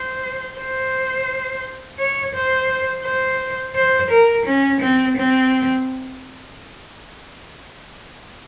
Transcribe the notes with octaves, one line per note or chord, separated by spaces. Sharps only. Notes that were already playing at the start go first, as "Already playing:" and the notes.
Already playing: C5
C5
C#5
C5
C5
C5
A#4
C#4
C4
C4